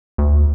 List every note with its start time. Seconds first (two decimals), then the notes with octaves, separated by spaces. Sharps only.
0.18 D2